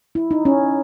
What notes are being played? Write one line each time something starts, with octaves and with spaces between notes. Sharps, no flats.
E4
D#4
C#4